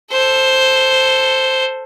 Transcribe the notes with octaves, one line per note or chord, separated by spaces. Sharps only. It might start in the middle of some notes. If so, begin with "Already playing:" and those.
A4 C5